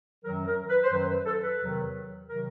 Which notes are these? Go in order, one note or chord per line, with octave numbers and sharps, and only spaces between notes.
F#2 D#3 F#3 A#4
A#4
B4
C5
F#2 D#3 F#3 B4
B4
A4
B4
E2 C3 D#3 F#3
C3 D#3 F#3 A#4